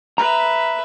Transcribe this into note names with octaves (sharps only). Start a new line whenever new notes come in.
B4 E5 A#5